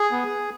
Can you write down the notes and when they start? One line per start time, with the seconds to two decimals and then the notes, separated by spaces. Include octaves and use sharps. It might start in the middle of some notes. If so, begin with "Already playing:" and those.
Already playing: G#4
0.12 B3